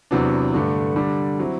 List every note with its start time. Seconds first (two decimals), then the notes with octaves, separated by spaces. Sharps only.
0.11 E2 C3 F#3 B3 D4
0.53 G2 D3 A3 D4
0.96 D3 G3 D4
1.39 F#3 C4 E4